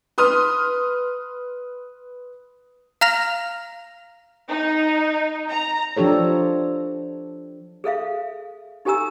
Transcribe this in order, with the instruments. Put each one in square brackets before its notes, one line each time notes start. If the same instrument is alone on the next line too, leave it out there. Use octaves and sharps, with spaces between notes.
[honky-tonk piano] B4 C6 D#6 F6
[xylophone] F5 A#5 F6 A#6 F7
[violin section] D#4
A#5
[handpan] F3 D4 G4 A4 C#5
[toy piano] G#4 A4 E5 F5
D#4 G4 A4 G#5 A#5 E6